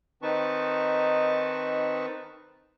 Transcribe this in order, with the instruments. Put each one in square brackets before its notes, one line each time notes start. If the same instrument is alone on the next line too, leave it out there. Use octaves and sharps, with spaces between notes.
[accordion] D#3 C4 D#4 B4 A5 C#6